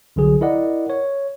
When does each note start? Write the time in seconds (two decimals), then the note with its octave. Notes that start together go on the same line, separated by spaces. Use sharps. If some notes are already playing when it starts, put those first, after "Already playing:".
0.16 C2 D3 F#3 G#4
0.41 E4 A#4 D5 D#5 F#5
0.90 C#5